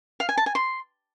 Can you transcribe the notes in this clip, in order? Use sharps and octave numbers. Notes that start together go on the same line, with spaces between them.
F5
G#5
A5
G#5
C6